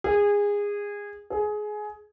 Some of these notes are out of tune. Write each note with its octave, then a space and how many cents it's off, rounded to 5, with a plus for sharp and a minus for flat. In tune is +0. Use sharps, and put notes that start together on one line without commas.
G#4 -20
G#4 +20